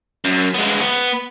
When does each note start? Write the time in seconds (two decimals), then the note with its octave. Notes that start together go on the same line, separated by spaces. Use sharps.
0.25 F#2
0.54 G#3 B3
0.81 B3